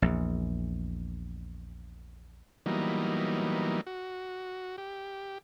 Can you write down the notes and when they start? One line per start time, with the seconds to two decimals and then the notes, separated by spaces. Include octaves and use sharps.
0.02 A#1 E2
2.66 E3 F#3 G3 A#3 B3 D#4
3.87 F#4
4.78 G4